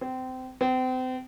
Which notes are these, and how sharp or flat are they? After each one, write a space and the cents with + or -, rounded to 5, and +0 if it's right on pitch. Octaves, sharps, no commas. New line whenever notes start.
C4 -25
C4 -35